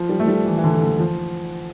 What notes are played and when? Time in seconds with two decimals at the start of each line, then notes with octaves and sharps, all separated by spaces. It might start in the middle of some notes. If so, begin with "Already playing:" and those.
Already playing: F3
0.09 G3
0.20 A3
0.27 G3
0.45 E3
0.58 E3
0.64 D3
0.81 D3
0.99 F3